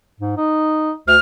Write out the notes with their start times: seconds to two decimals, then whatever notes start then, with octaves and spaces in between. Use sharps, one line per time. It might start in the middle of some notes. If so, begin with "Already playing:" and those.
0.20 G#2
0.37 D#4
1.07 D2 F6